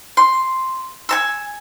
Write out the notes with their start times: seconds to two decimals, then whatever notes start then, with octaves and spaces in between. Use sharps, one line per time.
0.17 C6
1.09 G#5 A5 E6